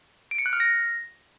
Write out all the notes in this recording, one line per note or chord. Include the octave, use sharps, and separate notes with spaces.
D7
C#7
F#6
F6
A#6